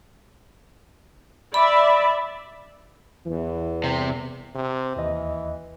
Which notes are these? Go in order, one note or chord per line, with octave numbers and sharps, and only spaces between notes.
D5 E5 B5
E2 E3
C2 C3
C3
D#2 E3 D#5